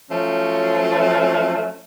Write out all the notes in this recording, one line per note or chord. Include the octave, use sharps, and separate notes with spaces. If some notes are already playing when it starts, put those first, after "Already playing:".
F3 F#3 A3 C#4